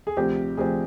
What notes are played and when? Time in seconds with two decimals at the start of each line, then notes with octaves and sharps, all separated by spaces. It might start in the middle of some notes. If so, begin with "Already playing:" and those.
0.07 G#4
0.17 D2 C3 F3 C4 G4
0.57 D2 C3 F3 C4 G#4